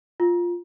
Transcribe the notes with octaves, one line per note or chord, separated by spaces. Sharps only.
F4